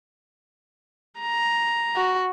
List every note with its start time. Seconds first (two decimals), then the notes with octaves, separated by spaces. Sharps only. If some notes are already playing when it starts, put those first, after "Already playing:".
1.19 A#5
1.96 F#4